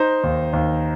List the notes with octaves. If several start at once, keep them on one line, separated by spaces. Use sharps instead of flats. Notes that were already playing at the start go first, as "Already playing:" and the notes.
Already playing: D#4 C5
D#2
D#2